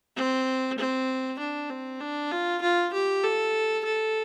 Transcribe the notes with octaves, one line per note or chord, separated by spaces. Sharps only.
C4
C4
D4
C4
D4
F4
F4
G4
A4
A4